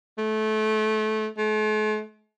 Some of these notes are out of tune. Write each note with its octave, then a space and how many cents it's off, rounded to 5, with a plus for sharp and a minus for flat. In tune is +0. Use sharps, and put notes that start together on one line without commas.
A3 -25
A3 -45